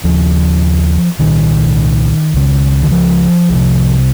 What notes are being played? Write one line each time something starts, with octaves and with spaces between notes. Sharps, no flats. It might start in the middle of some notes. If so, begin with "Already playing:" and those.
D#2 C#3 F3
C2 A#2 D#3
C#2 C#3
D#3
F3
C2 C3